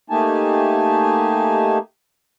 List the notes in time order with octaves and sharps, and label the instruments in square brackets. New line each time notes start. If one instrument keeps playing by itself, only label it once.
[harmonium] A3 A#3 D#4 G4 G#5 A5